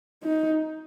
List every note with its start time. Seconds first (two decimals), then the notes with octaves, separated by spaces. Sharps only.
0.24 D#4